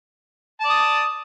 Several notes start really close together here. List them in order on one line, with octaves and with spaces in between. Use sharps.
A5 D5 D#6